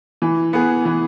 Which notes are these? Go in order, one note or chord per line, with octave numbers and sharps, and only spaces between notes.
E3
B3 G#4
E3